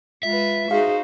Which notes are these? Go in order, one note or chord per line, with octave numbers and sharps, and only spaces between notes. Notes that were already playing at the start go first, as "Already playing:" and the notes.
G#3 F4 B4 E5
D#4 F#4 G#4 C5 F5